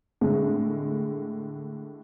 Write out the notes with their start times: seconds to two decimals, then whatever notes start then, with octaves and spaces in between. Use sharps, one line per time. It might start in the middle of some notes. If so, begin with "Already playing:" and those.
0.21 A2 D3 G#3